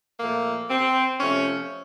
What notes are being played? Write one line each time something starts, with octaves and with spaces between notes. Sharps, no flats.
A#2 F3 A3 A#3
C4
C3 F3 A3 C#4